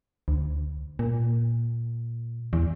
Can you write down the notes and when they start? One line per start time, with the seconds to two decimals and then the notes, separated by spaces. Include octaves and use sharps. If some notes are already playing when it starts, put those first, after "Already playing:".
0.28 D2
0.99 A#2
2.53 E2